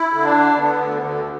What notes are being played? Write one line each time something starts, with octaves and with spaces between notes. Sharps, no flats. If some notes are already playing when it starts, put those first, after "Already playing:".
Already playing: E4
D3
D4
D3
D3 B3
D2
D3